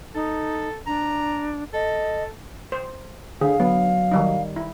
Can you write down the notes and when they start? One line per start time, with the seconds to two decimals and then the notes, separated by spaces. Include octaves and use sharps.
0.14 D#4 A4
0.87 D4 A#5
1.73 A4 D#5
2.72 C5
3.41 D3 G#4 F5
3.60 F#3 B3
4.11 D#3 G3 D#4
4.56 E4